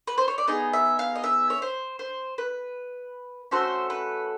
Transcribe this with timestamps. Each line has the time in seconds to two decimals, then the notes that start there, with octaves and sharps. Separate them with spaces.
0.07 B4
0.18 C5
0.28 C#5
0.38 D5
0.47 B3 D#4 G#4 D#5
0.73 E5
0.99 F5
1.15 D#5
1.24 E5
1.50 C#5
1.62 C5
1.99 C5
2.38 B4
3.51 A3 C#4 F#4 A4 C5
3.90 B4